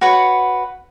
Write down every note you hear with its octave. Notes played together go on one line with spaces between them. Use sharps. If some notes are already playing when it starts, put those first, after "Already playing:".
F#4 B4 C#5 F#5